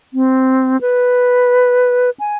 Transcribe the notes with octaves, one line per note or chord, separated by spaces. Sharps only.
C4
B4
G#5